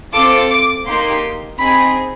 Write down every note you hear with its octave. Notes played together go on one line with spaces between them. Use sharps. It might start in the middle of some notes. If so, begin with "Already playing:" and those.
C4 F4 A4 D6
D6
A#3 D#4 G4 C6
C4 D#4 G#4 B5